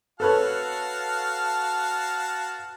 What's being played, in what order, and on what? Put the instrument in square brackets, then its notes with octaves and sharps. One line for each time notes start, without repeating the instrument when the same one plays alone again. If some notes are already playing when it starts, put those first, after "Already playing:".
[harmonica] F#4 F5 A5 [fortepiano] A4 B4 C#5